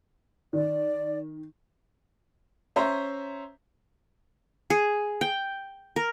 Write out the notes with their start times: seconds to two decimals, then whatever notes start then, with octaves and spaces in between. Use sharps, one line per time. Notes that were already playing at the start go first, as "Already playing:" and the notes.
0.53 D#3 D5
2.76 C#4 C5 E5 A#5
4.70 G#4
5.21 G5
5.96 A#4